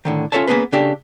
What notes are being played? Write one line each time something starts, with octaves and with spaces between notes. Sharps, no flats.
A2 D3 D#3
C#4 F4 A4 C#5 E5 A5
A#3 B3 C#4 D4 G#4 B4
C#3 D4 G4 A4